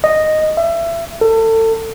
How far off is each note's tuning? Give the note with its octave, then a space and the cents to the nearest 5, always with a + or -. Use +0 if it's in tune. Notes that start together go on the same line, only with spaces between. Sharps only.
D#5 -5
E5 +30
A4 +30